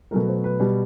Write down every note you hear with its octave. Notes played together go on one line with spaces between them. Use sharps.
B2 F#3 A3 A#4
C5
B4
B2 G3